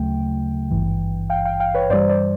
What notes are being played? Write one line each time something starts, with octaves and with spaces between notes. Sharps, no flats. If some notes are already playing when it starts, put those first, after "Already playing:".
Already playing: D2 C#3 F#3 A3 G5
G#1 G2 E3
F5 G5
F5 G5
F5 G5
B4 C#5
G2 E3 G3 C5 D5
C5 D5